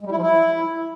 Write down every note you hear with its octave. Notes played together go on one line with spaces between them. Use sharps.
G#3
G3
E4
F3
E4